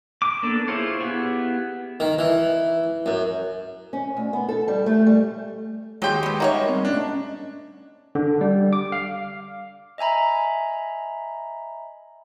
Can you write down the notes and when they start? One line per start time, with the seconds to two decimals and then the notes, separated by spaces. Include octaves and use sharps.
0.22 D6
0.43 A#3 B3 D4 A4
0.68 E4 F4 G#4 C5 C#5
1.01 B3 E4 G4 G#4
2.00 D#3
2.19 E3
3.06 F#2
3.93 C#4
4.17 D2
4.33 B3
4.49 A4
4.68 G3
4.86 A3
5.07 G3
6.02 D#2 F#3 G#3 G4 G5 C6
6.23 F#3 B3
6.40 D#4 F#4 A#4 C#5 E5 F#5
6.68 G3 B3 C4
6.85 A2 C#4 D4 D#5
8.15 D3
8.41 G3
8.73 D6
8.92 F5
9.98 D#5 E5 G#5 A#5 B5